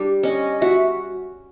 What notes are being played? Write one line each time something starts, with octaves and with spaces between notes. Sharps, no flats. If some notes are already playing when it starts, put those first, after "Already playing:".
Already playing: G3 D4
C#4 D#5
F#4 E5